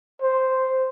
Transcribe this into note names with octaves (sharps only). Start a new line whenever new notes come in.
C5